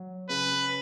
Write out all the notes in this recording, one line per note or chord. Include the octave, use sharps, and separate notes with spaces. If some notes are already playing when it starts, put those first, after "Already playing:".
Already playing: F#3
C#3 B4